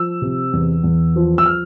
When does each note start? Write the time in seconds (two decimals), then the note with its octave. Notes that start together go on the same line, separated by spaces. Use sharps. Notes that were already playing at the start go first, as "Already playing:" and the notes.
Already playing: F3 E6
0.22 C3
0.53 E2
0.84 E2
1.16 F3
1.38 E6
1.46 F6